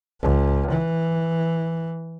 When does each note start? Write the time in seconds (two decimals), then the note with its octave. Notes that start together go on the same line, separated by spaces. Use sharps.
0.21 C#2
0.71 E3